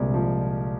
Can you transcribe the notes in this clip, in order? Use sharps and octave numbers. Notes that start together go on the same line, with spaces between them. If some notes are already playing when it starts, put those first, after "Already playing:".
Already playing: C2 A#2 D3 G#3
F3